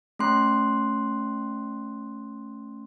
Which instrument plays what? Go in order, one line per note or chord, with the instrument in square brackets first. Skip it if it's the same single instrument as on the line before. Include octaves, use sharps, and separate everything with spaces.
[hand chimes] A3 C#4 C6 F#6